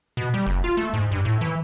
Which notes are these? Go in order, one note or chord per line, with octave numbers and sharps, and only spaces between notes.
B2
G3
F#1
F4
A3
G#2
G2
A2
E3